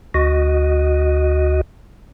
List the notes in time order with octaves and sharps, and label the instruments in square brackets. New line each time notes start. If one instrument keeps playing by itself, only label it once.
[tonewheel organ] D2 F#4 D#5